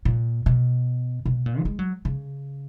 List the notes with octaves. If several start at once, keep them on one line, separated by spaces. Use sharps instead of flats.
A#2
B2
B2
A#2
F#3
G#3
F#3
C#3